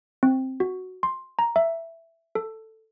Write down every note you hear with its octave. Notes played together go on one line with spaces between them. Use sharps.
C4
F#4
C6
A#5
E5
A4